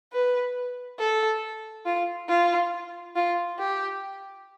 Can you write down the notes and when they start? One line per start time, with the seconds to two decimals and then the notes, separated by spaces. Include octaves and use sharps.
0.13 B4
1.00 A4
1.86 F4
2.29 F4
3.16 F4
3.59 G4